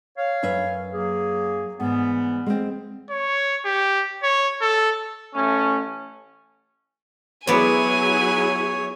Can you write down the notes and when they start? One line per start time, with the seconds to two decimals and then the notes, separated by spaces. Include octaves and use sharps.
0.17 C#5 F5
0.43 F#2 B4 E5
0.93 F#3 A#3 G#4
1.80 G#2 E3 G3 B3
2.46 G#3 C4
3.10 C#5
3.65 G4
4.23 C#5
4.62 A4
5.35 A1 A3 C#4
7.47 F#3 B3 E4 G#4 C#5 D5 G#5